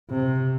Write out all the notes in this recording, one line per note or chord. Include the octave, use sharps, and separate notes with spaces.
C3